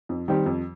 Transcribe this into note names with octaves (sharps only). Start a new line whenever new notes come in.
F2
D#3 G3 C4 G4
F2